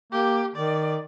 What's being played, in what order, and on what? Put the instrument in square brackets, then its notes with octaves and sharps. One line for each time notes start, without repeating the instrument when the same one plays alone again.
[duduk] A#3 [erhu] G4
[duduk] D#3 [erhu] D5